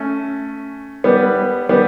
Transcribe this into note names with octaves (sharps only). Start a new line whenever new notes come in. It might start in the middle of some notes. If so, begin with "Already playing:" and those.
Already playing: A3 C#4
G3 B3
G3 B3